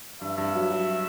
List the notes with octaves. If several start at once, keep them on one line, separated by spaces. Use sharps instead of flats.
G2 E5
G2
F#3
F#3